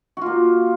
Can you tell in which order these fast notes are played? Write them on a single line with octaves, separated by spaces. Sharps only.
F#4 F4 A#3